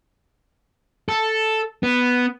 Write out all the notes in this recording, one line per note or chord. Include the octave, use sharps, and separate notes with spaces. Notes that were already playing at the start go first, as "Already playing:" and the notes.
A4
B3